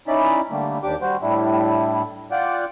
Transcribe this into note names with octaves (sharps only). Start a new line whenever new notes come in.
C#4 D#4 E4 D5 B5
D3 G3 A3 A#3 D4
D#2 D4 G4 D6
G3 F#4 C5
A2 G3 D4 E4
F4 D5 F#5 G5